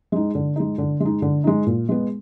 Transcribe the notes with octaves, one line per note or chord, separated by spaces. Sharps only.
G#3 D#4
D3
G#3 D#4
D3
G#3
D#4
D3
G#3 D#4
A#2
G#3 B3